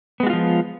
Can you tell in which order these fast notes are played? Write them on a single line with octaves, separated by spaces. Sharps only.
B3 G#3 F#4 F4 F3